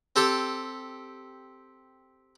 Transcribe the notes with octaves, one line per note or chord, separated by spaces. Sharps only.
C4 G4 A4 A5